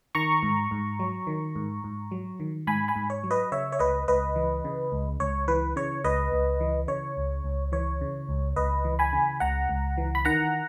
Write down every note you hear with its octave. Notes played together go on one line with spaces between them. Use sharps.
D#3 A#5 C#6
G#2
G#2
F#3
D#3
G#2
G#2
F#3
D#3
G#2 G#5 B5
G#5 B5
G#2
C#5
F#3
B4 D#5
C#3 C#5 E5
C#5
C#2 B4 D#5
C#2 B4 D#5
E3
C#3
C#2
C#2 C#5
E3 B4
C#3 C#5
C#2 B4 D#5
C#2
E3
C#3 C#5
C#2
C#2
E3 C#5
C#3
C#2
C#2 B4 D#5
E3
G#5 B5
C#3
C#2 F#5 A#5
C#2
E3
B5
D#3 F#5 A#5